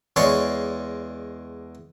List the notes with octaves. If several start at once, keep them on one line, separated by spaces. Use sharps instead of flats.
E2 G#3 C#5 D5 C6 C#6